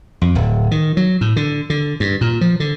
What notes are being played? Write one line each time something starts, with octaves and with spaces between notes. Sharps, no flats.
F2
D1
D#3
F#3
A2
D3
D3
G2
A#2
F3
D3